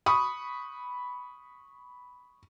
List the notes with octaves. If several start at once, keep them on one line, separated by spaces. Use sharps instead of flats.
B5 C#6 D#6